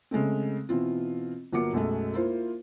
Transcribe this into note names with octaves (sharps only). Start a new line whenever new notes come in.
C#3 G#3 A3 C4
B2 E3 C4 F4
G1 F#3 A#3 F4 D6 C#7
B1 F#2 G#3 A3
A#3 E4 F4 C5